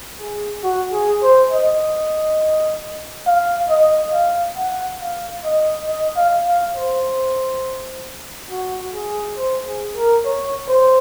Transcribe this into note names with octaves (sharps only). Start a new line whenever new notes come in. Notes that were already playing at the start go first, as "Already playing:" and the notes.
G#4
F#4
G#4
C5
D#5
F5
D#5
F5
F#5
F5
D#5
D#5
F5
F5
C5
F#4
G#4
C5
G#4
A#4
C#5
C5